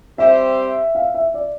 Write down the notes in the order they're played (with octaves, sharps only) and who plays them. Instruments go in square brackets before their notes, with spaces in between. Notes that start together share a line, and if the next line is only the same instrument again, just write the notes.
[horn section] G3 C4 G4 C5 [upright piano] E5
[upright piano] F5
E5
D5